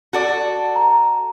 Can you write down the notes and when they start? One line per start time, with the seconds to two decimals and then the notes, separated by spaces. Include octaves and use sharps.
0.13 F#4 A4 D5
0.76 A#5